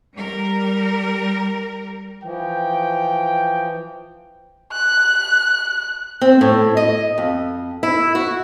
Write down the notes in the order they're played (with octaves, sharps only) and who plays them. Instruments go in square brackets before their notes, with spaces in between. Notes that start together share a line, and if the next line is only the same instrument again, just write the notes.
[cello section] G3 A#4
[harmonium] E3 F3 [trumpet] G5
[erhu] F#6
[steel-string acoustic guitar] C4
A2
D#5
F2
E4
F#4